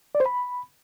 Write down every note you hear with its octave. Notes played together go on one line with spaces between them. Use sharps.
D5
C5
B5